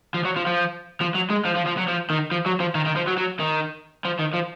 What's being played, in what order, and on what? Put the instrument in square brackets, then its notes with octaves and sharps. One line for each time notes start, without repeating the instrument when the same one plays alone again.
[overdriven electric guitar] F3
F#3
F3
F3
F3
F#3
G#3
F3
F3
F3
F#3
F3
D#3
F3
F#3
F3
D#3
D#3
F3
F#3
F#3
D#3
F3
D#3
F3